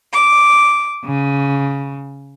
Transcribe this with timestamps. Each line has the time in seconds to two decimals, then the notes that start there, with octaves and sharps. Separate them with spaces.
0.12 D6
1.06 C#3